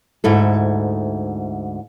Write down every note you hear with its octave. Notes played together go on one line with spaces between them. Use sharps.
D2 G#2 E4 A4